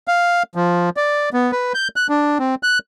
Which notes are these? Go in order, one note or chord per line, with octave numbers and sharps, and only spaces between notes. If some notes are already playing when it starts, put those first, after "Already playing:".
F5
F3
D5
B3
B4
G6
F#6
D4
C4
F#6